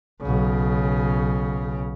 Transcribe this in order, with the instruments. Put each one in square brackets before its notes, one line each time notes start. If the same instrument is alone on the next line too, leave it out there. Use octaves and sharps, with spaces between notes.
[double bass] B1 C#3